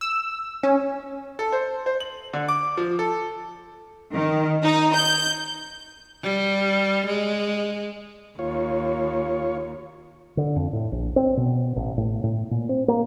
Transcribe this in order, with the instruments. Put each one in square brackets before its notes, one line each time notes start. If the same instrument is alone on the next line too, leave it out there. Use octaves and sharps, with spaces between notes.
[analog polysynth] E6
C#4
[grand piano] A4
C5
C5
F#7
D3
D6
F3
A4
[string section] D#3
D#4
G6
[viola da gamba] G3
G#3
[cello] D#2 [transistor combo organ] F4 C#5
[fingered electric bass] D3
F2
A2
A#1
C4
B2
A1
A2
A2
A#2
C4
A#3